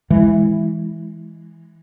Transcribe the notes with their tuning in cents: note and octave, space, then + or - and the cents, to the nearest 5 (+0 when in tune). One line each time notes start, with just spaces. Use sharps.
E3 -5 G#3 +0